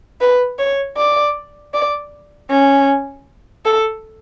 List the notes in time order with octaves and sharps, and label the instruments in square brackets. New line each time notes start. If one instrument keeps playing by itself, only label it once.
[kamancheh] B4
C#5
D5
D5
C#4
A4